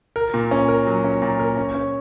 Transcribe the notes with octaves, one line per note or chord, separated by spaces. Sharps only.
A#4
A#2
C#4
A#4
F#3
C#4
A#2
A#4
C#4
C#4